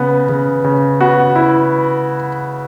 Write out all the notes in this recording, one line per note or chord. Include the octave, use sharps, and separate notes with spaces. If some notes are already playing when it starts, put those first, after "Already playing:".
Already playing: C#3 B3
C#3
C#3
B3 F#4
E4